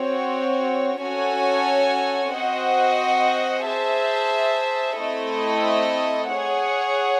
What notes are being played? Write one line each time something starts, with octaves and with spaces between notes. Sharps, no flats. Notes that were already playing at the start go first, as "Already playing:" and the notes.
Already playing: C4 F#4 C#5
C#4 F#4 A4 C#5 G#5
C4 F#4 C5 D#5 F#5
G#4 C5 E5 A5
A3 C4 E4 A4 D#5
G#4 C#5 F#5